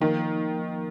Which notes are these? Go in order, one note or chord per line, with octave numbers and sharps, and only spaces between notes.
D#3 F3 A#3 D#4